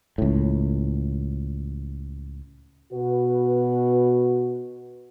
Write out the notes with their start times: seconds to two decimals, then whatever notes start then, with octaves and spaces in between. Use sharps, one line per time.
0.18 C#2 A2
2.92 B2 F#4 B4